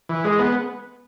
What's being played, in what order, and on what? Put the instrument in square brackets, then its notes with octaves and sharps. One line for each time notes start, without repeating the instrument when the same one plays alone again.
[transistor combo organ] E3
G#3
B3